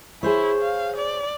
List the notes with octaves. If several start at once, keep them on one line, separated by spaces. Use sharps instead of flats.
E4 G#4 C5 C#5
F5
D5